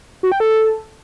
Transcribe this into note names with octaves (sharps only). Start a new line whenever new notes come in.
F#4
G5
A4